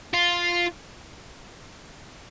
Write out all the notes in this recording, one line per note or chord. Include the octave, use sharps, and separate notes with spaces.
F4